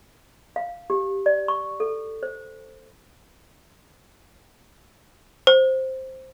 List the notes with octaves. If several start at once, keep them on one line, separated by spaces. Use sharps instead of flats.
F5
G4
D5
C#6
A4
C5
C5